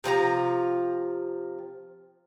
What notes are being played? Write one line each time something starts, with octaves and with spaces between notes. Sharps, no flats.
C3 F3 G4 A#5